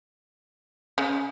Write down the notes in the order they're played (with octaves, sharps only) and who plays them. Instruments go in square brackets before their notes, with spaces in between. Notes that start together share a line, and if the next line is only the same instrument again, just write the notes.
[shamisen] C#3